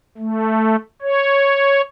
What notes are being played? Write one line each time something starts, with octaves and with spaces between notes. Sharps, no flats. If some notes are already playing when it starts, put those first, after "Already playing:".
A3
C#5